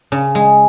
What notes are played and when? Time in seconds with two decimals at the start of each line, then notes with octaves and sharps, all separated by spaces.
0.12 C#3
0.35 G#3